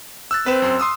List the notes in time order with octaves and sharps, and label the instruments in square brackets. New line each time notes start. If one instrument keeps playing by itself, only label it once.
[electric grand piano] E6 F#6 A6
[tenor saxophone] C4 [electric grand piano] B4 E7
[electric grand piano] F#2 C6
C6 D#6 E6